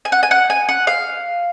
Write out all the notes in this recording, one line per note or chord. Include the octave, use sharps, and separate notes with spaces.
G#5
F#5
G#5
F#5
G#5
F#5
F5